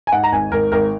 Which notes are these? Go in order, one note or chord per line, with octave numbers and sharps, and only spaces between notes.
G#5
G#2 F#5
A#5
G#1 G#5
G#1 A#4
G#1 A#4